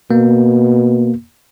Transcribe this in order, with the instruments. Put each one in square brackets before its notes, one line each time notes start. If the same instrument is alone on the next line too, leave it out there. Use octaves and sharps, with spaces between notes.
[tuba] B2 [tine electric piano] A#3